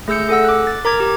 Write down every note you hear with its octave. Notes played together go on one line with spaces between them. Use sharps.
A3 G#4 E6 G6 C#7
G#4 A4 F#5 E6
D6 F#6
A6
A#4 A#5 D6 G#6
G4